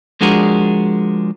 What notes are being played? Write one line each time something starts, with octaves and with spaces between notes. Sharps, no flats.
F3 G#3 D4 F#4 G#4 A#4